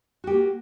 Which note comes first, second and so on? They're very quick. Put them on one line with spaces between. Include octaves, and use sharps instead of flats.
F#4 G4 A#3